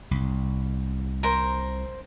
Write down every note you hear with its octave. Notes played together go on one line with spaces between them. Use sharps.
C2
A#4 C5